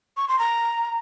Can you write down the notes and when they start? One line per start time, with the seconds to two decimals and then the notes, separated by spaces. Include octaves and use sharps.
0.17 C#6
0.28 C6
0.39 A#5